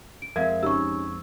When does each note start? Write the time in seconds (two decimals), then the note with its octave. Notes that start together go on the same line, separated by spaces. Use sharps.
0.22 D7
0.36 F2 G#3 C4 A#4 E5 F5 G#6
0.63 C#4 D#4 G4 C#6 E6